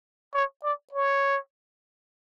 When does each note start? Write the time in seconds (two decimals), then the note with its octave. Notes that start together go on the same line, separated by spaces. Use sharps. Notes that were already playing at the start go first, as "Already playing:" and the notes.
0.34 C#5
0.63 D5
0.93 C#5